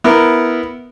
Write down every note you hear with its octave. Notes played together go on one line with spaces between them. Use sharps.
B3 E4 A#4